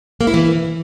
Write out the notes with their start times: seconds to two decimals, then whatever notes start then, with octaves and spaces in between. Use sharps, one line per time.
0.21 A#3
0.27 E4
0.34 E3